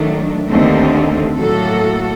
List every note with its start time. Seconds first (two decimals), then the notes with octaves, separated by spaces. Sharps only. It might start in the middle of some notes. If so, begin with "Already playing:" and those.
Already playing: D#3 F#3 A3 D4
0.49 D#2 D3 A3 C4
1.37 A2 F#3 A#3 F#4 A4